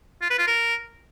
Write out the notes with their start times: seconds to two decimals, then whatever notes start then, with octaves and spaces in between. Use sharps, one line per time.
0.22 F4
0.30 B4
0.38 F4
0.47 A#4